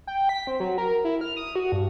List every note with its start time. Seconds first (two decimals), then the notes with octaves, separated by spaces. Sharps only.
0.07 G5
0.29 B6
0.47 C4
0.60 F#3
0.78 A#4
1.05 E4
1.21 F6
1.37 D#6
1.56 F#4
1.72 G2